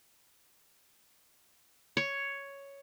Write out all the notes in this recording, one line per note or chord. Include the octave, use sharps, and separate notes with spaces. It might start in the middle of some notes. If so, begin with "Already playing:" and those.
C#5